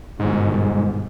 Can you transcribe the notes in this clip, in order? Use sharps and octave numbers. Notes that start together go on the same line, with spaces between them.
G1 G#2 B2 D#3